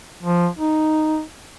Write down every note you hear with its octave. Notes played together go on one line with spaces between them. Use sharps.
F3
D#4